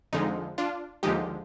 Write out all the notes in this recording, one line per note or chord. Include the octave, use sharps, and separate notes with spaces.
F2 D3 F3 G#3 D#4
D4 F4
D#2 D3 F3 G#3 D#4 G4